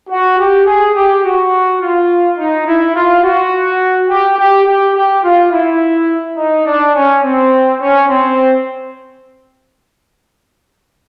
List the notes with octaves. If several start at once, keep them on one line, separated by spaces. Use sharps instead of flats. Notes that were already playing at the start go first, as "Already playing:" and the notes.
F#4
G4
G#4
G4
F#4
F4
D#4
E4
F4
F#4
G4
G4
G4
G4
F4
E4
D#4
D4
C#4
C4
C#4
C4